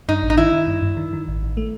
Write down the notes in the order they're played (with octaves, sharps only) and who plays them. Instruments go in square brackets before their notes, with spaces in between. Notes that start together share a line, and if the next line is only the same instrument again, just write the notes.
[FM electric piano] G2 [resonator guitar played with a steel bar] D#4
[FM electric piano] A1
[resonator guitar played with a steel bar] D#4
[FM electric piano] D#3 [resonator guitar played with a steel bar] E4
[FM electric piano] D#3
G2
G2
D#3
D#3
A1
A1
A3